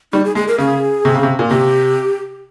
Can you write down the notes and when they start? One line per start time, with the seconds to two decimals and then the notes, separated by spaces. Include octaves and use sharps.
0.13 G3 D#4
0.25 G#4
0.35 G#3 G#4
0.48 A#4
0.58 C#3 G#4
1.05 C3
1.15 C#3
1.23 C3
1.39 A#2
1.51 C3 G4